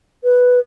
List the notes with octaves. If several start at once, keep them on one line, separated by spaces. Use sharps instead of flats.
B4